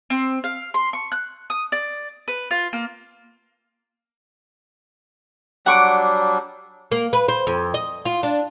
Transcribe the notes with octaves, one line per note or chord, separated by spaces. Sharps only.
C4
F5
C6
C#6
F#6
D#6
D5
B4
F4
A#3
F#3 G3 D4 F#5 C#6 D6
A#3
B4
C5
F2
D#5
F4
D4